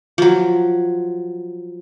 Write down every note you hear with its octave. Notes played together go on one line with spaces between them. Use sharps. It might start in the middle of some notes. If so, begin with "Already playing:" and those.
F3 F#3